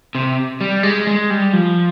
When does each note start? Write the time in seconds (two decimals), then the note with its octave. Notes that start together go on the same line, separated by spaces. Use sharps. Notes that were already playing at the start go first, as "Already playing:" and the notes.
0.15 C3
0.61 G3
0.83 G#3
1.07 G#3
1.30 G3
1.53 F3